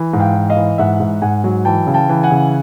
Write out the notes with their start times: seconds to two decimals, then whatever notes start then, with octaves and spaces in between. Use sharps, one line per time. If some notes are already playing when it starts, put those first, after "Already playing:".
Already playing: E3
0.13 G#2
0.20 F5 G5
0.34 E3
0.50 D#5 F5
0.57 E3
0.78 G#2 E5 F#5
1.00 G#2
1.22 G#2 F#5 G#5
1.44 F#3
1.65 E3 G5 A5
1.87 C#3
1.94 G5 A5
2.09 E3
2.23 F#5 G#5
2.31 C#3